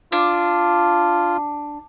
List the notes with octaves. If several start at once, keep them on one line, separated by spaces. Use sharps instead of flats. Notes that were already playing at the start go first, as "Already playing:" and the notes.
D4 F4